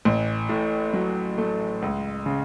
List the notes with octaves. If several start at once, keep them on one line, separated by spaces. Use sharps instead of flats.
A1
A2
F#3
A3
C#2
C#3